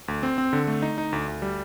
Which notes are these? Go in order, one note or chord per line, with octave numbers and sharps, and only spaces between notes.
D2
C4
C4
D3
A3
D#4
D#4
D2
D2
G3